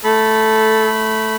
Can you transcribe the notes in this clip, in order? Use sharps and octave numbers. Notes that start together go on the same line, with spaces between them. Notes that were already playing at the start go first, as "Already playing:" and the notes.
A3 A4 B5